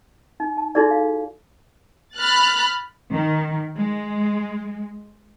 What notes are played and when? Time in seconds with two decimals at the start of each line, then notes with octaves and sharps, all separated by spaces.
0.40 D#4
0.57 A5
0.75 D#4 E4 F#4 G#4 A4 D5
0.91 F5
2.17 B5 F6 F#6 A6
3.11 D#3
3.76 G#3